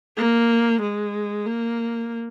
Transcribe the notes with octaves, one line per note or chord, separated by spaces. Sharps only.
A#3
G#3
A#3